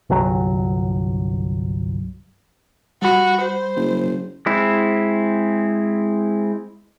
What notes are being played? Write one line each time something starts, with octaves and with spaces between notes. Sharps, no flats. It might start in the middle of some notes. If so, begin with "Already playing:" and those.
G1 C2 F#3
G3 F#4 B5
C5
F#1
G#3 C4 E4